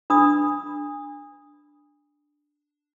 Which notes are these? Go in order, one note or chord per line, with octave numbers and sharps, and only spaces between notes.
D4 B5 D#6